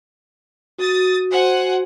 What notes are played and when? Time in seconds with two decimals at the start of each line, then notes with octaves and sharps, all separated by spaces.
0.79 F#4 D#6 A6
1.32 C5 F#5 G#5